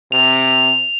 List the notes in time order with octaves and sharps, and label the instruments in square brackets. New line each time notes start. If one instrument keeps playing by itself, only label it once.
[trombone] C3 [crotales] F7